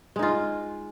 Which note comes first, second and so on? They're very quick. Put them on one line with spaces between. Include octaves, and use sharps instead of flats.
G#3 D#4 F4